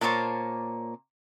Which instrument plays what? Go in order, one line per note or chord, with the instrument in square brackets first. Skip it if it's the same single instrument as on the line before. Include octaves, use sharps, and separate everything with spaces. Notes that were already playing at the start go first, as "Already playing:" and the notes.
[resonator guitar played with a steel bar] A#2 A#3 C5 C#5 A5